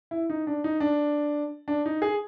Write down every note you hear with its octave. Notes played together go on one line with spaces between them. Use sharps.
E4
D#4
D4
D#4
D4
D4
D#4
G#4